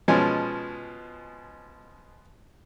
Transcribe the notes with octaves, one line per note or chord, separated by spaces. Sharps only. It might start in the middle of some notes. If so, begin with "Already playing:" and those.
B2 F3 G#3 C#4 G#5